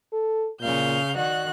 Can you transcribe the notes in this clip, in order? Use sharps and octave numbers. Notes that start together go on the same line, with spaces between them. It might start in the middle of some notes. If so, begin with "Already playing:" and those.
A4
A#2 C#3 F5 G6
D#3 F#4 D5 F#6